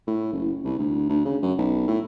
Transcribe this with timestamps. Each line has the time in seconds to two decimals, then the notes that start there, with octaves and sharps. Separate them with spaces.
0.07 A2
0.32 F#1
0.65 C2
0.78 D2
1.09 D2
1.25 C#3
1.42 F#2
1.58 B1
1.88 A2